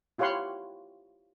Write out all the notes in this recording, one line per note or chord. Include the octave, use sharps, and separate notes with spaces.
E4 F4 G4 C#5 F#5 C6